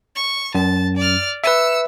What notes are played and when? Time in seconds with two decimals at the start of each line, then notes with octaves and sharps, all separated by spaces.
0.15 C#6
0.55 F#2 A5
0.97 D5 F6
1.44 B4 E5 E6 C#7